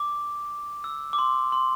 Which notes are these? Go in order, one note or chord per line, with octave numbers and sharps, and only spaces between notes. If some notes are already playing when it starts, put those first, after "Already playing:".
Already playing: D6
E6
D6
C6
C6